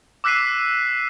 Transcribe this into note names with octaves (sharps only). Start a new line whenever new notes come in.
D6 E6 F#6 B6 C7 D#7